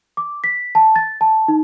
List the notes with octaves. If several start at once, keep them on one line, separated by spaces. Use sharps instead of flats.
D6
B6
A5
A6
A5
D#4